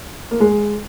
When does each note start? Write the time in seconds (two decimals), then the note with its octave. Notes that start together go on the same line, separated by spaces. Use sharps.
0.31 A#3
0.40 G#3